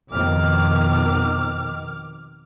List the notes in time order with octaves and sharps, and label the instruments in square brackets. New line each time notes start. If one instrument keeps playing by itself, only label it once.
[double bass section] F2 B2 D#3 [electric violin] D6 F6